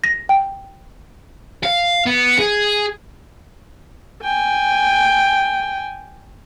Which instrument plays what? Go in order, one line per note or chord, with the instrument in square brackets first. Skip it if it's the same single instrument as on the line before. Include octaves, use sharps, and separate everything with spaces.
[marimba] A#6
G5
[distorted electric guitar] F5
B3
G#4
[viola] G5 G#5